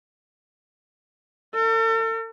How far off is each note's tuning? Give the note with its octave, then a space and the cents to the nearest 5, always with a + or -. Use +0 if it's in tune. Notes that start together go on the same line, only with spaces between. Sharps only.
A4 +45